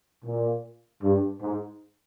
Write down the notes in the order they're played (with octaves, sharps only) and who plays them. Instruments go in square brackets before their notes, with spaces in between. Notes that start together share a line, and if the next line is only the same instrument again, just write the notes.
[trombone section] A#2
G2
G#2